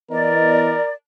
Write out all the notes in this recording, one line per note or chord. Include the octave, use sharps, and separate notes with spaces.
E3 B3 A#4 D5 D#5